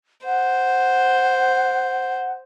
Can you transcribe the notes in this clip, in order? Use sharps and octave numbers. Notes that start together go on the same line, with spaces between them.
C5 F#5